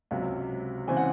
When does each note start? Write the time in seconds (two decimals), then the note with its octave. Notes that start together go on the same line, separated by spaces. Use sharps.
0.11 C#2 C3 F#3
0.87 C#3 E3 C4 G#5
0.97 F#5